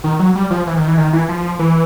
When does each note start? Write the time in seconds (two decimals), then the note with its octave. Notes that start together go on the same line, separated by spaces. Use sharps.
0.04 D#3
0.19 F#3
0.35 G3
0.51 F3
0.67 E3
0.77 D#3
0.87 E3
0.98 D#3
1.13 E3
1.29 F3
1.59 E3